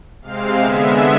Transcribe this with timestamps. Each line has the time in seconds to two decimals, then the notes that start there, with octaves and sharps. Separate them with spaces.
0.22 C3 G#3 C4 F5
0.59 D3 G#3 B3 E5